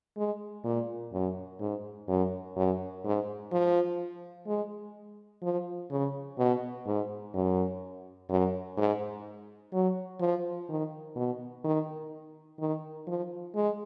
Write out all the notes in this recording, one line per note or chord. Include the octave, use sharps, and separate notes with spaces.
G#3
A#2
F#2
G#2
F#2
F#2
G#2
F3
G#3
F3
C#3
B2
G#2
F#2
F#2
G#2
F#3
F3
D#3
B2
D#3
D#3
F3
G#3